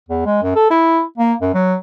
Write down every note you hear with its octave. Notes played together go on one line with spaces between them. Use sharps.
E2
G#3
F#2
A4
E4
A#3
F#2
F#3